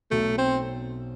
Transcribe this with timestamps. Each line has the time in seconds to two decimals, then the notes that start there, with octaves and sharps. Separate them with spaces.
0.11 B1 B2 F#3 A3
0.38 C4